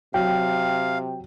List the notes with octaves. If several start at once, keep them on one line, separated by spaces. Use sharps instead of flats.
C3 F#3 F5 G5